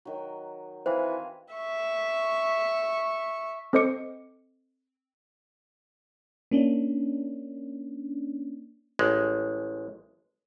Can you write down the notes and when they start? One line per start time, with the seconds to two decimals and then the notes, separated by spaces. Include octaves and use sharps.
0.05 D#3 F#3
0.86 E3 C4 C5 F5 G#5
1.53 E5 C#6
3.73 C4 A4 C5 D#5 D6 C#7
6.51 A#3 C#4 D4
8.99 A1 G#3